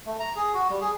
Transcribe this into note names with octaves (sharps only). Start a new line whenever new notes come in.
A3
A#5
G#4
F#4
G3
G#4